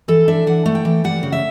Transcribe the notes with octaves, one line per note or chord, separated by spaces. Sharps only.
E3 A4
D4 E5
E3 F#5
A3
G5
E3
G3 F#5
C#3
E5